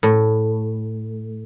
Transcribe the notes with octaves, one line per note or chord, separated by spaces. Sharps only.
A2